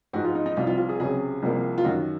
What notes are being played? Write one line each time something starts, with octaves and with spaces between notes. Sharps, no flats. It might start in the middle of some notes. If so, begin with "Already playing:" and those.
G#2 F3 G#3 F#4
F4
D#4
D#4
C2 C3 F3 F4
F4
F4
G#4
C#2 C3 F#3 C#4 G#4
C2 C3 F3 A#3
F4
F#2 D#3 F#3 F#4